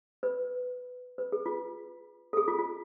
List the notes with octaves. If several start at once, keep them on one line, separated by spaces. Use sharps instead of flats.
B4
B4
G#4
F4
A4
G#4
F4
F4